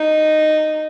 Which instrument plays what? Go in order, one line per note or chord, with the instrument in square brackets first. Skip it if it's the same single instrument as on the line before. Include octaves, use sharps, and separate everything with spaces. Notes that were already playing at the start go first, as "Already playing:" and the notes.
Already playing: [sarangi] D#4